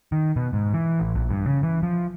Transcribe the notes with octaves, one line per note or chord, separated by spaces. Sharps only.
D#3
B2
G#2
E3
A1
A#1
G2
C#3
E3
F3